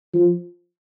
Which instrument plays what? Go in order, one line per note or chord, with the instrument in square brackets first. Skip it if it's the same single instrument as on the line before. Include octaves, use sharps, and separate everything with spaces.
[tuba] F3